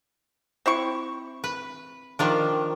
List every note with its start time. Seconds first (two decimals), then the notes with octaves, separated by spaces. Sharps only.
0.66 C4 E4 C#6
1.44 B4
2.19 D#3 F3 D4